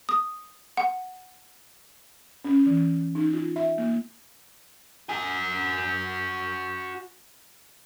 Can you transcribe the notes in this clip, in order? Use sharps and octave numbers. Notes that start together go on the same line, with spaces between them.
D#6
F#5
C#4
E3
D#4
F4
E5
A#3
F#4 G#5